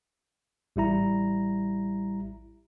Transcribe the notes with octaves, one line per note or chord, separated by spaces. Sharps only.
A1 G3 E4 A#5